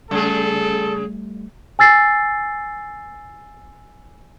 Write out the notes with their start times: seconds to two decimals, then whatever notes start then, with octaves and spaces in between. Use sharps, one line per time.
0.11 C#3 G3 A3 G#4 A4
1.79 G#5 E6 A6 C7